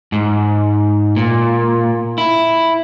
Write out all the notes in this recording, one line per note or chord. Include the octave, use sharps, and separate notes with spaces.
G#2
A#2
E4